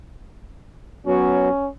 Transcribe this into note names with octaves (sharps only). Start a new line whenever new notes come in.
F#3 B3 C#4 F#4